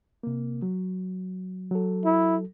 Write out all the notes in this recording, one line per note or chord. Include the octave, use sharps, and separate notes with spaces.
C3 A#3
F#3
F#3 A4
E4